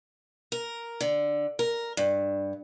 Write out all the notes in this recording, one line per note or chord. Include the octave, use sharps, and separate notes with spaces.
A#4
D3
A#4
G2